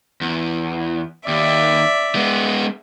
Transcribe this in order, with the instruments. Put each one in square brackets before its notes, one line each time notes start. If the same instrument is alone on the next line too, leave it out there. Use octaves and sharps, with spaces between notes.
[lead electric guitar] E2
[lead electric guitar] D#2 [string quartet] D5 E5
[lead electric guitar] G#3 B3